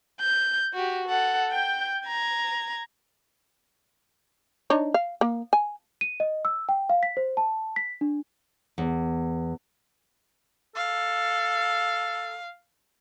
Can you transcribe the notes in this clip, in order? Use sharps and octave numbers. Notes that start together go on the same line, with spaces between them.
G6
F#4 G4
A4 F#5
G5 G6
A#5 G#6
D4 D#4 C#5
F5
A#3
G#5
D#7
D#5
E6
G5
F5
B6
C5
A5
B6
D4
E2
A4 F5